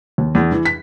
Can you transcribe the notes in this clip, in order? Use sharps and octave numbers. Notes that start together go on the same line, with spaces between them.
D#2
E2
E3
B6